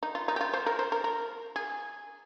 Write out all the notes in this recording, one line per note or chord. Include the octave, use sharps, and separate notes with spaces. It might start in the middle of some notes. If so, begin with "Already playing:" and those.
D#4
F4
D#4
G4
F4
C5
A#4
C5
A#4
A#4
G#4